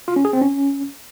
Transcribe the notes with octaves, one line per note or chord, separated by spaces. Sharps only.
F4
C#4
G#4
C4
C#4